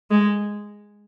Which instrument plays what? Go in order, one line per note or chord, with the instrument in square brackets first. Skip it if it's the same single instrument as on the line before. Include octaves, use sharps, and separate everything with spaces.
[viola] G#3